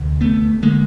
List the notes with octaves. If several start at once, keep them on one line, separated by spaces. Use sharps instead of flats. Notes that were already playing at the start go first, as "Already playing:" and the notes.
Already playing: D2 C3
A3 B3
D3 G#3 A#3